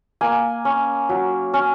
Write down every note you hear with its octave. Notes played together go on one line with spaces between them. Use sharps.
A#3 G#5
C#4
F#3
C#4